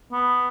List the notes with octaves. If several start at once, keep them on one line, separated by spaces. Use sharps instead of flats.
B3